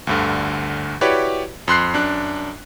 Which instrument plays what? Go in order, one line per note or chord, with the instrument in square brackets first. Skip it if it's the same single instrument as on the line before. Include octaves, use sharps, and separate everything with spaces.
[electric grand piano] D2 G2 D3
E4 F#4 G4 B4 C#5 D5
F2 C6 F#6 C7
F#2 D4 F#6